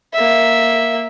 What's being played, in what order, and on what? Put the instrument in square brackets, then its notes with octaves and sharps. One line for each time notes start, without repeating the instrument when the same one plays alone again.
[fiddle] A#3 E5